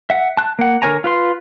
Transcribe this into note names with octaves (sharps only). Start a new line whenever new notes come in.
E5 F#5
A5 F#6
A#3 F#5
D3 A#4 C#5 G#5 A#5
F4 B4 C6